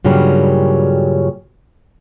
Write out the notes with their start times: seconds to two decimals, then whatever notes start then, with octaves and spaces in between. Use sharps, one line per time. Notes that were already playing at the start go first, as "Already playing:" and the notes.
0.05 G2 A#2 C#3 F#3 G3 C#4